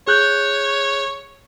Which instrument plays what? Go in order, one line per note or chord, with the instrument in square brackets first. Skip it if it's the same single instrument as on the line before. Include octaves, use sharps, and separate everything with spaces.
[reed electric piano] G#4 F#6 G6 [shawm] C#5